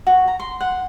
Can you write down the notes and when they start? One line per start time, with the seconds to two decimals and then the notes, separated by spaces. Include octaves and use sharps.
0.07 F#4
0.28 A#5
0.40 C6
0.61 F#5